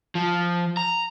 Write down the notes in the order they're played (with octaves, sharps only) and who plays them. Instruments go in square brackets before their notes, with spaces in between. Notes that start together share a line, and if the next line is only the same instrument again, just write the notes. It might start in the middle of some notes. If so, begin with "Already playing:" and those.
[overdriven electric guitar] F3
A#5